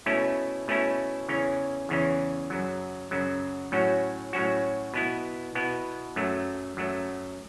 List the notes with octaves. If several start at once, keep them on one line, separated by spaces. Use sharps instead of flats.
B2 A3 C#4 E4
B2 A3 C#4 E4
E2 C#3 E3 C#4
E2 C#3 E3 C#4
F#2 C#3 F#3
F#2 C#3 F#3
A2 F#3 C#4 F#4
A2 F#3 C#4 F#4
B2 B3 E4
B2 B3 E4
F#2 F#3 A3
F#2 F#3 A3